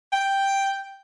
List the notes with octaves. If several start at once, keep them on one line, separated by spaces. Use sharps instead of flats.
G5